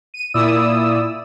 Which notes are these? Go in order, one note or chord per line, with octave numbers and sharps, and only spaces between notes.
D#7
A#2 E4 D5 D#6 E6